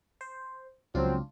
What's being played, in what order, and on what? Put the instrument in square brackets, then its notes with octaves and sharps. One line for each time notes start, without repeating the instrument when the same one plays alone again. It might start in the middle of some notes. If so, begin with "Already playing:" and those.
[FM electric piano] C5
[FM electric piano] C#2 D4 F4 [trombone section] F3 F#3 C4